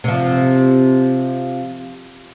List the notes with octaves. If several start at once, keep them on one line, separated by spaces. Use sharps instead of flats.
C3 F3